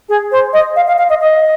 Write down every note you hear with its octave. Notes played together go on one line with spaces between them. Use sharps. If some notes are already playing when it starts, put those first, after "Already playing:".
G#4
C5
D#5
F5
F5
F5
D#5
D#5